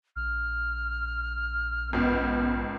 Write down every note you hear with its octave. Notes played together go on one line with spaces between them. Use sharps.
A#1 F6
G#1 C#2 B3